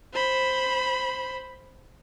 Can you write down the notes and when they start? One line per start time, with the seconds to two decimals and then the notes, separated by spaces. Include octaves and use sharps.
0.14 C5 B5